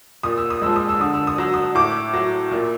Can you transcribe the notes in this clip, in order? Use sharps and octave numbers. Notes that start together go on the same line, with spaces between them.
A#2 D#6
E6
D#6
F3 G#3 E6
D#6
E6
D3 D#6
E6
D#6
F#3 E6
D#6
A2 D6
F#3
A#2